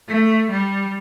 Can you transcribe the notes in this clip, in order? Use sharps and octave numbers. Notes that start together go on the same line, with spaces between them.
A3
G3